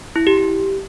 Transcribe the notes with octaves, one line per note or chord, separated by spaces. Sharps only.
E4
G4
G4